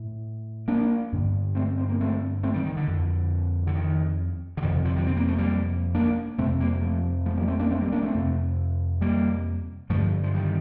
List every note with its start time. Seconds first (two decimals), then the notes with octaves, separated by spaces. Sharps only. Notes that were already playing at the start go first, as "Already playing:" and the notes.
Already playing: A2
0.68 A#3 D4
1.12 G2 D3
1.55 A3 C4
1.78 C4
1.89 A#3
2.01 A3 C4
2.43 A3 C4
2.54 D#3 G3
2.66 D#3
2.77 D3
2.87 F2 D3
3.67 D3
3.75 D#3
4.57 D3
4.62 F2 C3 D#3
4.85 D3 F3
4.96 D#3 G3
5.07 C4
5.17 A#3
5.28 A3
5.38 G3 A#3
5.95 A#3 D4
6.38 F2 C3 A3 C4
6.60 G3 A#3
6.82 F3 A3
7.26 F3 A3
7.37 G3 A#3
7.48 A3 C4
7.59 A#3 D4
7.70 A3 C4
7.81 G3 A#3
7.92 A#3 D4
8.03 A3 C4
8.14 F2 C3
9.01 G3 A#3
9.90 G2 D3 F3 A3
10.23 F3
10.34 D#3 G3